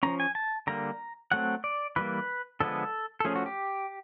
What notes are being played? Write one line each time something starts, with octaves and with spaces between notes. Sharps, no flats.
F3 A#3 C#4 A#5
G#5
A5
D3 G3 A#3 A#5
F#3 A3 C4 F#5
D5
E3 G3 A#3 B4
D3 F3 G#3 B3 A4
A4
F3 A3 C#4 G#4
F#4
G4